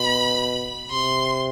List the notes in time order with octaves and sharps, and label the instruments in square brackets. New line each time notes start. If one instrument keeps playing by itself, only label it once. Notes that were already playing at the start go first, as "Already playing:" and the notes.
Already playing: [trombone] B2 [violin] B5
[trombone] C3 [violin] C6